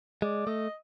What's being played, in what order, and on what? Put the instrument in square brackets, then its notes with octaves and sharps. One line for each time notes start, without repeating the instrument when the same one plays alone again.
[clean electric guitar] G#3 [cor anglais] D5
[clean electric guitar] A3 [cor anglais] D#5